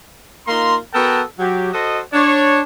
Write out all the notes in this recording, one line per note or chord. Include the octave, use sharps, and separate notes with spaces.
A#3 D#4 F4 A#5 C6
B3 F#4 A4 A#4 G5 A5
F#3 G4
F#4 A4 C5 D#5
D4 C#5